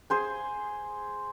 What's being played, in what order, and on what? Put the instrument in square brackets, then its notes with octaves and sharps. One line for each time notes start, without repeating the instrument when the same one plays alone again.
[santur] G#4 C5 G#5